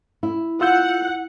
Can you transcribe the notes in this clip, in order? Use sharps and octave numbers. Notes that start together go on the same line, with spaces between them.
E4
F4 F#5 E6 G6